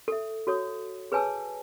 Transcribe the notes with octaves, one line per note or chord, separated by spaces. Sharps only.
A4 E5
F#4 A4 C#5 D#6
G#4 B4 C#5 G#5 A5 E6